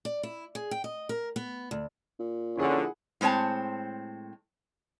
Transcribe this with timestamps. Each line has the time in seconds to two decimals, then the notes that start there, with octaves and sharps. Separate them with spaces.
0.05 D5
0.23 E4
0.55 G#4
0.71 G5
0.84 D#5
1.09 A#4
1.36 B3
1.71 D2
2.19 A#2
2.57 D3 F3 C#4 E4 G#4 F#5
3.21 A2 G#3 C4 C#5 A5